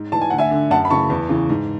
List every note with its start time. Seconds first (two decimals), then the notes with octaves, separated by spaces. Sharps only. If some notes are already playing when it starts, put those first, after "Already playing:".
Already playing: G#2
0.12 E3 A5
0.21 G#5
0.30 D2 F#5
0.38 E5 G#5
0.51 D3
0.71 F#2 F#5 A5
0.85 B5
0.90 C#3 E3 A5 C#6
1.10 E2
1.29 C#3 E3
1.49 G#2